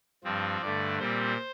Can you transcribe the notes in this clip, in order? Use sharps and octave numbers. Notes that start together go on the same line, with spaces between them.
G2 F3 C4
G2 D3 A3 D5
A#2 G3 C4 C5